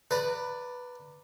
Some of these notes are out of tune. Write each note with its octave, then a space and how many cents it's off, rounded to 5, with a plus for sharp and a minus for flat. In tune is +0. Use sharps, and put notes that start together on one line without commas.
B4 +0 D5 +0 A#5 -30